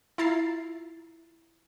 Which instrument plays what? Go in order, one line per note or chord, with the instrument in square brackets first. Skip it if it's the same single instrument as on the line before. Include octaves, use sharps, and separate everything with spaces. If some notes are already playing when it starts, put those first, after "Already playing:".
[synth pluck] E4 F4 A#5 A6 C7